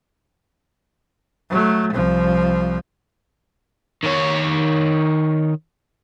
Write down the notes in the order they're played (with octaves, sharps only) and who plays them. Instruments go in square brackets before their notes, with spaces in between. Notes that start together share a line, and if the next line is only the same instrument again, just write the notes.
[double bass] F#3 A3
C2 F3
[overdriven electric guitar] D#3 C#5